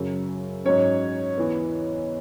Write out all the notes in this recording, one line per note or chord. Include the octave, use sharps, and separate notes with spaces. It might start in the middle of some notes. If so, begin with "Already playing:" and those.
Already playing: F#2 C#3 F#3
G#2 F#3 C#4 C#5
E2 E3 B3